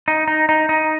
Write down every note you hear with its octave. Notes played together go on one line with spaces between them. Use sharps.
D#4
D#4
D#4
D#4